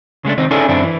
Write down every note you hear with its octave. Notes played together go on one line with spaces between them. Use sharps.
C#3 G#3 A3 D4
C2 D#3 C4 D#4
C#4 D#4 E4 G#4 A4 D5
F#2 D3 C4 D4 E4
E3